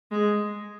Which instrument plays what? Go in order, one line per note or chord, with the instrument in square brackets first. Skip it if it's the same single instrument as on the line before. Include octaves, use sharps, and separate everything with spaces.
[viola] G#3